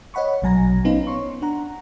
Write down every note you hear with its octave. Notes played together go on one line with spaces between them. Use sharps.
C#5 D#5 F#5 B5 C#6
A#1 B2 F#3 G#5 A#5 A#6
B3 C#4 D#4 B4 C5 F5
C#5 C6 C#6
D4 F#5 A#5